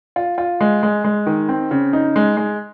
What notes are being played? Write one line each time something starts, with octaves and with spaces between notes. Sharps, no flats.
F4
F4
G#3
G#3
G#3
D#3
C4
C#3
D#4
G#3
G#3